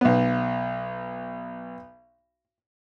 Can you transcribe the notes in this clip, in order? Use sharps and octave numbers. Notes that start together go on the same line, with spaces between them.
B1 B3